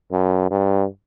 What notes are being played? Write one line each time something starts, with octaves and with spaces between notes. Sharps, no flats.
F#2
G2